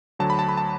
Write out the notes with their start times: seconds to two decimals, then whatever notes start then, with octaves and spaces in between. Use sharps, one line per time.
0.19 D2 D3 F#3 A5
0.30 B5
0.39 A5
0.49 B5
0.57 A5